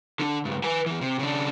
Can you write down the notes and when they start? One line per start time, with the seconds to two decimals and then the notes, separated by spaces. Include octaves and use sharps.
0.20 D3 D4
0.45 C#2 G2
0.64 B4 G#5
0.86 E2 E3
1.01 C3
1.19 C#3 D4